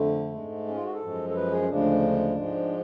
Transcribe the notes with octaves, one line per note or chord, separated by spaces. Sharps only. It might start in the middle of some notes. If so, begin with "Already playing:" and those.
Already playing: F2 D3 A3
G#2 G#3
C#4
F4
F#4
A4
F#2 F3 G#3
A4
B4
G#4
C#4
D2 C#3 F3 G#3 D4
G#2 F3 G#3